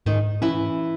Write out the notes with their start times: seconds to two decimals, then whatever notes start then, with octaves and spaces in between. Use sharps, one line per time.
0.06 G#2 D#3 D#4
0.42 E3 C#4 E4